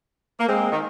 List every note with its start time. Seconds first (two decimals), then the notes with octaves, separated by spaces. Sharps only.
0.39 A#3
0.47 G#3 C4
0.72 D#3